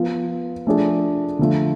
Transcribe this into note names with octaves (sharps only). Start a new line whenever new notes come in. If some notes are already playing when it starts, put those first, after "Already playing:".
Already playing: F3 B3 F4
F3 A3 D4 G#4
D3 F3 A3 F4